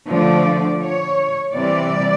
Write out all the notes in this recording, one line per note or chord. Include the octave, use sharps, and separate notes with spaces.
D3 F3 A3 D5
C#5
C3 E3 G3 D5